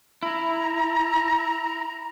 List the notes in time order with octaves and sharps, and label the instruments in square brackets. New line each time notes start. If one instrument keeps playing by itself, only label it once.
[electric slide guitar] E4 [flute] A#5